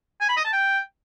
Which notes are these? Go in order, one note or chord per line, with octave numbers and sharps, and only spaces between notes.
G#5
B5
D#5
A5
G5